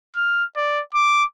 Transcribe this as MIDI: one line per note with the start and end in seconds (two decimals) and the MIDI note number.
0.16 0.44 89
0.56 0.81 74
0.94 1.24 86